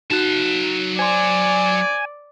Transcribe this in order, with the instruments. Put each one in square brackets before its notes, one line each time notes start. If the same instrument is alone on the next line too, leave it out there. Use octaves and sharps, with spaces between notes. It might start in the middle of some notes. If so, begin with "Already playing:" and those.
[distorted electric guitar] F#3 A5 [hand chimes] D#4 F#4 F#6
[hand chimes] C5 C6 [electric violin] D5 [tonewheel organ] G#5